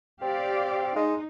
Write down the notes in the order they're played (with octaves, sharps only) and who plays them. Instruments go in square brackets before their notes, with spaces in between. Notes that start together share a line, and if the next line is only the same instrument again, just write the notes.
[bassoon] C4 [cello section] G4 D5 F5
[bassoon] G#3 [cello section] D#4